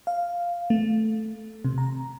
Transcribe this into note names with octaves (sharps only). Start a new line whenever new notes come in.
F5
A3
C3
A#5